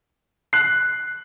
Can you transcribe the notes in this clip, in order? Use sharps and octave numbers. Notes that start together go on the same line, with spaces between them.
F#6 C7